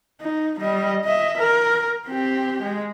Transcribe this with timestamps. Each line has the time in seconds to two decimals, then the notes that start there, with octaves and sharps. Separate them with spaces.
0.21 D#4
0.60 G3 D#5
1.05 D#5 E5
1.38 A#4
2.07 C4 G4
2.63 G#3